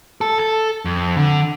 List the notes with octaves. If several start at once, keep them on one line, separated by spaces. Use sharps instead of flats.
A4
A4
F2
D3